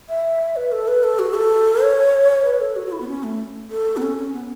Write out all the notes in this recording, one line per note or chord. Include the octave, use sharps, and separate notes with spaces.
E5
B4
A4
B4
A4
F#4
A4
C#5
B4
A4
F#4
F#4
E4
B3
C#4
A3
A4
B3
C#4
C#4
B3